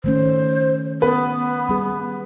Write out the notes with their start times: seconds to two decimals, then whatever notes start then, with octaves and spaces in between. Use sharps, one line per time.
0.04 D#3 A3 C#4 C5
1.02 B3 B4
1.69 G3 G#4